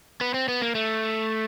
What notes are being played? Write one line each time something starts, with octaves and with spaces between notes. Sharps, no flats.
B3
C4
B3
A#3
A3